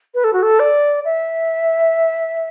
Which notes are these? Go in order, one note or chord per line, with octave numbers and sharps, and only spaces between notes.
B4
A4
F#4
A4
D5
E5